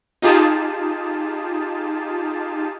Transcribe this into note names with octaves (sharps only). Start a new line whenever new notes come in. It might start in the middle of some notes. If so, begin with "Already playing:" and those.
D#4 F4 G4 G#4 A5